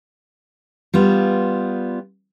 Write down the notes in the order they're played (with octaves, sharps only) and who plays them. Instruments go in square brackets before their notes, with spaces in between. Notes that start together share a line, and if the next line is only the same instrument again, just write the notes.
[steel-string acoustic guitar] G3 B3 F4